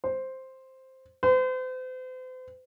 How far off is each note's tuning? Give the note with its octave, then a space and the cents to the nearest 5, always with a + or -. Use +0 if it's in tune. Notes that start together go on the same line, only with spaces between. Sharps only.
C5 +0
C5 -40